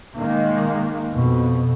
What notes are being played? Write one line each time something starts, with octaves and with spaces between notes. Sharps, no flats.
D#3 G#3 A#3
F2 B2